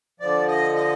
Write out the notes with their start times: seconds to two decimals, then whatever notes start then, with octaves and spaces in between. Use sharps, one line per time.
0.20 D3 F3 D5
0.48 D#5
0.75 D#5